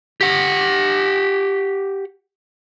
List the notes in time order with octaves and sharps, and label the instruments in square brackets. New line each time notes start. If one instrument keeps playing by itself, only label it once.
[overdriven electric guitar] G4 F#5